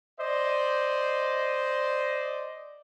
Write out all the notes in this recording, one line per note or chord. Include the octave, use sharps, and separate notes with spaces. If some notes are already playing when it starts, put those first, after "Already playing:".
C5 D5 D#5